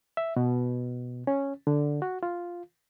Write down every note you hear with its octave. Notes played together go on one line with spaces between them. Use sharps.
E5
B2
C#4
D3
F#4
F4